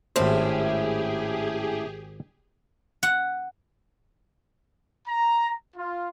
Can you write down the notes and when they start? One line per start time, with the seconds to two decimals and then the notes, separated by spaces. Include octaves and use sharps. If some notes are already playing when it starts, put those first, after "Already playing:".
0.16 G#1 A2 C#4 E4 G4 G#4 C5
3.03 F#5
5.07 A#5
5.76 F4